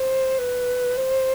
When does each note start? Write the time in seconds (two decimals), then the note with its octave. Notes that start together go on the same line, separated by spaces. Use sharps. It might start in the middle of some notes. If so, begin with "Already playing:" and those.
Already playing: C5
0.39 B4
0.97 C5